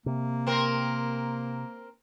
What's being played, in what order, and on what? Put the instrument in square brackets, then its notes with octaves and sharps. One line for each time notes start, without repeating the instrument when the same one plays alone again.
[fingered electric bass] C3 [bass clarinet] A#3
[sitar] C4 A#4